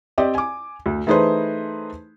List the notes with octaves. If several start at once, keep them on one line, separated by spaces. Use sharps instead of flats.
C4 G4 D5 D#5
G#5 D6
D2
E3 A3 D#4 G#4 B4 C5